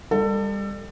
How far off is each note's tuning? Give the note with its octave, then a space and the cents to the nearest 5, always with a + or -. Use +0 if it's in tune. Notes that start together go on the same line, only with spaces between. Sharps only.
G3 +35 A4 +25